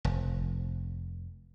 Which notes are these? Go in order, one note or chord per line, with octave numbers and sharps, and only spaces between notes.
F1